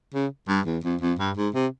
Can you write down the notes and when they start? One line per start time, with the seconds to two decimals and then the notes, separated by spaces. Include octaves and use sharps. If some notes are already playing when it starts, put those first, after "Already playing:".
0.14 C#3
0.48 G2
0.66 E2
0.84 F2
1.01 F2
1.19 G2
1.37 G#2
1.54 C3